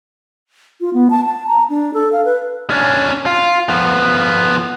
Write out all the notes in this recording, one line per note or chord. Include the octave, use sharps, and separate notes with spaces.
F4
B3
A5
A5
A#5
D4
A4
F5
B4
C#4 D4
F4
F3 B3